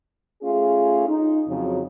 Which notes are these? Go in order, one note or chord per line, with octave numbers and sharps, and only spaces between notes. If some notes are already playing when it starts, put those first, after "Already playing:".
A3 C#4 F4 G#4
D#4
F2 C#3 F#3